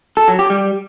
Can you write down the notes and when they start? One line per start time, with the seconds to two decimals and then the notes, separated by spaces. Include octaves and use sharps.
0.17 A4
0.28 F#3
0.39 G4
0.50 G3